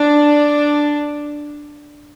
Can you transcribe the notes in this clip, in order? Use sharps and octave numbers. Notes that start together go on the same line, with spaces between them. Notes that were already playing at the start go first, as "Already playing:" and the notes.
Already playing: D4